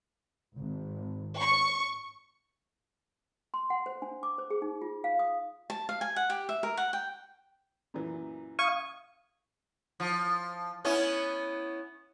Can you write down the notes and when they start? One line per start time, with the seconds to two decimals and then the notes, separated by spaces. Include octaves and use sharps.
0.54 G#1
1.39 C#6
3.54 C6
3.70 F#5
3.86 C5
4.02 D4
4.23 D6
4.38 C5
4.50 G#4
4.62 D#4
4.82 F4
5.04 F5
5.19 D#6
5.70 A5
5.89 F5
6.01 G#5
6.16 F#5
6.30 G4
6.49 E5
6.63 A#4
6.77 F#5
6.93 G5
7.94 F#2 A#2 E3
8.59 F5 C#6 D#6 G#6
10.00 F3
10.85 B3 C#4 E4